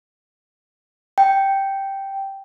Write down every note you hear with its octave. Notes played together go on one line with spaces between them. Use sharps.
G5